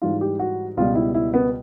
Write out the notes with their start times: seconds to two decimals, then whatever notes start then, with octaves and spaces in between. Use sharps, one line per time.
0.02 G#2 E3 G3 F4
0.21 G4
0.39 F#4
0.77 C#2 B2 G3 F4
0.95 E4
1.14 E4
1.34 B3